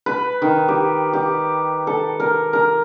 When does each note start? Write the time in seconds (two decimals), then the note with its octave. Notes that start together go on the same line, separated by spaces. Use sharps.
0.06 B4
0.42 D#3
0.68 G4
1.13 G4
1.87 A4
2.20 A#4
2.53 A#4